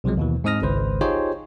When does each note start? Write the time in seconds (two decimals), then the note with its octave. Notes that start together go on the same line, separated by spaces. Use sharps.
0.04 B1 C3 F3 F#3 G#3
0.17 D#2 B2 E3
0.44 G#2 C4 D#5 D#6 F6 A#6
0.62 G#1 C#2 B4 C5
1.01 D#4 F4 G4 G#4 C5 C#5